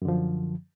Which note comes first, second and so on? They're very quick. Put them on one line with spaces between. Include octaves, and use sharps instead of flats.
F#2 D3 F3